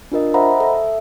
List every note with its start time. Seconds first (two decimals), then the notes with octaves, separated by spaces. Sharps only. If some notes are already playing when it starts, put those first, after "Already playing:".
0.12 D4 F4 A#4 D#5
0.34 C5 D#5 E5 F#5 A#5 B5
0.60 A4 E5